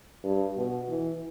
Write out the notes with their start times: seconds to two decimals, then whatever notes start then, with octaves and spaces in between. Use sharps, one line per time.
0.24 G2
0.57 B2
0.89 E3